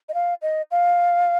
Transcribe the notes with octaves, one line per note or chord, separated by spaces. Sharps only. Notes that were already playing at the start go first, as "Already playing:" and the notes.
D#5
F5
D#5
F5